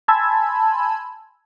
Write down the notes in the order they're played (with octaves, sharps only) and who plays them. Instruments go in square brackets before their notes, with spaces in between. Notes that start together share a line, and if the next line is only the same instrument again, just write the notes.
[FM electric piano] G#5 A5 B5 C6 E6 G#6